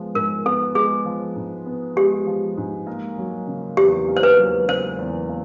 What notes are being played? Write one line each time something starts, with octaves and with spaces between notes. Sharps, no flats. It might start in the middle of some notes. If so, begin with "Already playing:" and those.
Already playing: F3 G#3 B3
G#2 A#4
B3 A4
G#3 G#4
F3
G#2
B3
G#3 G4
F3
G#2
A#3
F#3
C#3
E2 G4
A#3
C5
B4
F#3
C#3 C5
E2
A#3